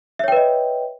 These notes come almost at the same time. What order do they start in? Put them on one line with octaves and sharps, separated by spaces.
E5 C#5 G5 B4 D#5